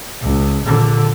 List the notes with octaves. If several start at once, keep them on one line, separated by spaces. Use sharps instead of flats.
C#2
A#1 D3